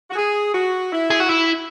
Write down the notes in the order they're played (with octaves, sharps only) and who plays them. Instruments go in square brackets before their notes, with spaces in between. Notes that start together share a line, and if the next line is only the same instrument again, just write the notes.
[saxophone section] F#4
G#4
F#4
E4
[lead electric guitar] G#4
F#4
E4